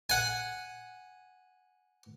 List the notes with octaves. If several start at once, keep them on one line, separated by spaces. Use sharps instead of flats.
F#5 G#5